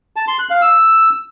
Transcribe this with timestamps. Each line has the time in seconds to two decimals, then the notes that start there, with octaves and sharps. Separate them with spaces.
0.16 A5
0.28 C6
0.39 F#6
0.50 F5
0.62 E6